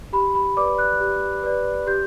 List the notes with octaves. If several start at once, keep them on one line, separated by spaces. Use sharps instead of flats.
G4 B5
B5
B4 D5 D6
F#6
G4
B4 D5
G4 G6